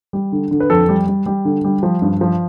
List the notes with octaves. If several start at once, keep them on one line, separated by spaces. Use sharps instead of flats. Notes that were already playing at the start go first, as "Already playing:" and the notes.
G3
D3
D3
B4
F2 A4
G3
G3
G3
D3
G3
F3
G2
F3